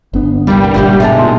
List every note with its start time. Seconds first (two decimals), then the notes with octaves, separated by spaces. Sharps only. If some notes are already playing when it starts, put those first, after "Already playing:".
0.13 G1 B3 D4
0.47 C2 G2 G3 A#3
0.74 G1 A#2 E4 F#4 G4
1.00 B2 G#3 D5 E5 A5 A#5
1.18 A#2 D#4 G#5 C6